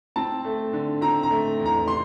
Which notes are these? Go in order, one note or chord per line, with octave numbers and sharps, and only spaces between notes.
C4 A5
A3
D3
C4 A#5
A#5
A3
E2
A#5
C3 C6